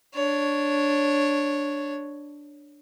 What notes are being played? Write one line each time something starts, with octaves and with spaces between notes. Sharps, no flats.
D4 C#5